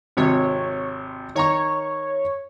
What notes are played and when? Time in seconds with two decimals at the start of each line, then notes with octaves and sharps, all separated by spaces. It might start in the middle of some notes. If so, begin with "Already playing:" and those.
0.17 G#1 C3 C#5
1.35 D#3 C#5 A#5 C#6